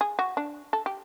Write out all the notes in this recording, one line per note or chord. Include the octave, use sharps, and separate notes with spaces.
G#4
F#4
D4
A4
G4